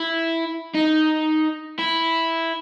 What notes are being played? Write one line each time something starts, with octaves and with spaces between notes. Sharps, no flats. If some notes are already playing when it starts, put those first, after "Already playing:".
Already playing: E4
D#4
E4